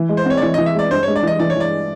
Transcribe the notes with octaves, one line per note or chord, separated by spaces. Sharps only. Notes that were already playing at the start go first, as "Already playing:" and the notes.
Already playing: E3
G#3
C5
C4 C#5
D5
E3 C#5
D#5
E3
E5
G#3 D5
G2 C5
C#5
G#3
D5
E3 D#5
E3 D5
C#5
E3 D5